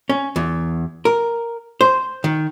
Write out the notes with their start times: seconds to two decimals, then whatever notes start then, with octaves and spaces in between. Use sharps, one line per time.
0.09 C#4
0.36 E2
1.05 A#4
1.81 C5
2.24 D#3